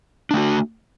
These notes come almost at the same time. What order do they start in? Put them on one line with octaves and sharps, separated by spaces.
D4 A3 F#4